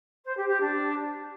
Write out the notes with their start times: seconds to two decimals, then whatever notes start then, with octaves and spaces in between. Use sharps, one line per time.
0.24 C5
0.36 G4
0.48 G4
0.60 D4